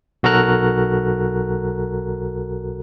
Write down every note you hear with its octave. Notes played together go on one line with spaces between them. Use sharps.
B1 F#4 A4 A#4 A#5 F#6